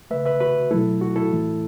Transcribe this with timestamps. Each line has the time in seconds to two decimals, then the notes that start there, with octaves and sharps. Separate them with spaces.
0.10 C#3 A3 B4 E5
0.26 B4 E5
0.40 F#4 B4
0.71 B2 F#3 A3 E4 A4
1.01 F#4
1.16 E4 A4
1.31 A2 E3 A3